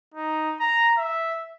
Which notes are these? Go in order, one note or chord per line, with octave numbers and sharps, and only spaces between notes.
D#4
A#5
E5